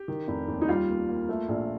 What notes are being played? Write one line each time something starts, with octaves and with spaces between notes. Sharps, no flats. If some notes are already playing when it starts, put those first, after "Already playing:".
Already playing: G4
D#3
F1
D#2
D#4
G3 F4
A#3
A#3
A3
A#1